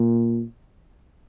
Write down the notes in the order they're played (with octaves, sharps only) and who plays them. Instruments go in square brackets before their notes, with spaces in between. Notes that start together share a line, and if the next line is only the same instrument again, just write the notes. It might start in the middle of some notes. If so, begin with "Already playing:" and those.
Already playing: [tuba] A#2